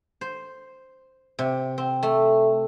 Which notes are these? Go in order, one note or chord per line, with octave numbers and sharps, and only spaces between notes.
C5
C3
C4
A3